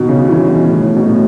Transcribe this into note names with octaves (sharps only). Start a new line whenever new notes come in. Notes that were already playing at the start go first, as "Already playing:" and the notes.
Already playing: B2 D#3
C#3
E3
B2
A2
B2
A2